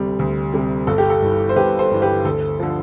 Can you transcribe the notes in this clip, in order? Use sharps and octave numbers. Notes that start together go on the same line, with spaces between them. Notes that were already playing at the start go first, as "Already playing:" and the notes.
Already playing: D2 C3 G3
D2
C3 G3
G1 A4
G4
A4
G2 E3
C5
G1 G4 B4
A4 C5
G2 E3
G4 B4
D2 A4
D3 F3